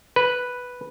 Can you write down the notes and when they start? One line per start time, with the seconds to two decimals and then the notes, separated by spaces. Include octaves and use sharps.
0.16 B4